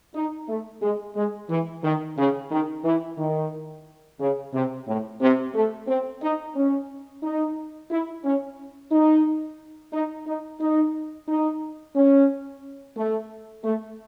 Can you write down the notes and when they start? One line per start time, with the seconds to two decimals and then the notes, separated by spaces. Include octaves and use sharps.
0.15 D#4
0.49 A3
0.83 G#3
1.16 G#3
1.50 E3
1.84 D#3
2.18 C#3
2.52 D#3
2.85 E3
3.18 D#3
4.20 C#3
4.54 C3
4.88 A2
5.21 C3
5.55 A3
5.88 C4
6.22 D#4
6.56 C#4
7.23 D#4
7.91 E4
8.25 C#4
8.92 D#4
9.93 D#4
10.27 D#4
10.61 D#4
11.28 D#4
11.96 C#4
12.97 A3
13.64 A3